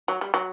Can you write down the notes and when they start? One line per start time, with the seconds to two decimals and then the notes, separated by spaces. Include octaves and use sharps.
0.08 F#3
0.21 G3
0.34 F#3